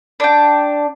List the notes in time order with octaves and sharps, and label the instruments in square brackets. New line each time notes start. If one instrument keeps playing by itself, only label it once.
[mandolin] D4 G5